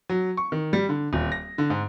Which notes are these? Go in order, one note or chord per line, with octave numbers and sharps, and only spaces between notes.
F#3
C#6
D#3
G3
D3
D#1
A#6
D3
G#2